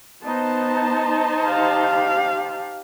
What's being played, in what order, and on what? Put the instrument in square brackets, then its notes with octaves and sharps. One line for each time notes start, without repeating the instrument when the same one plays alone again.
[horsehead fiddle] B3 [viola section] D#4 C5 A5
[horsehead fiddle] G4 F5